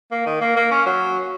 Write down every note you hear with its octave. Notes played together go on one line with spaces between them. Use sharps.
A#3
D#3
A#3
A#3
C#4
F#3